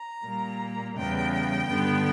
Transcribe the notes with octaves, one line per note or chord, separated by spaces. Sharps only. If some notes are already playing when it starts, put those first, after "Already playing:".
Already playing: A#5
A#2 G3 A#3
E2 C#3 G3 B3 G5
G2 D3 G3 B3